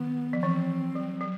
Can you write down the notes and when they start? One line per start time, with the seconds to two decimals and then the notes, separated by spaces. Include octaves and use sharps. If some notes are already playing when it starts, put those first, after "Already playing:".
Already playing: D#3 B3
0.33 F3
0.43 E3 C4
0.95 F#3
1.21 F#3